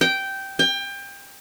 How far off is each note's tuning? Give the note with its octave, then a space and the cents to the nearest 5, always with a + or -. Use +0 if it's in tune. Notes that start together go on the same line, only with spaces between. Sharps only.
G5 -10
G5 +25